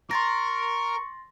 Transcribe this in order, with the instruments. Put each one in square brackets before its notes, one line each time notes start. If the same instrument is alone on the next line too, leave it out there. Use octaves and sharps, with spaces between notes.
[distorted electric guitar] A#4 [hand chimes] C6 A6 A#6 [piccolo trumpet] C#6